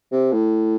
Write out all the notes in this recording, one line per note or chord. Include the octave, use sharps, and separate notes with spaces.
C3
A2